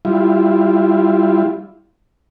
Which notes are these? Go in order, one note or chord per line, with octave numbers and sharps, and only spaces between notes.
G3 E4 F4